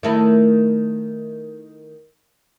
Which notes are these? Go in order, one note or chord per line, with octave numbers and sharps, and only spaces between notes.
D#3 A3 E4